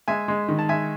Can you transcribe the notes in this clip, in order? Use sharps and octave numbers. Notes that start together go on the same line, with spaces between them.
G#3 E5 G#5
G#3
D#3
A5
G#3 E5 G#5